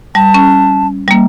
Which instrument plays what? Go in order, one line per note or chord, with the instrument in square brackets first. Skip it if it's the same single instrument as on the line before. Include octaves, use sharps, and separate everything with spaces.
[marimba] G3 [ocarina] A5
[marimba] C#4
G3 A#3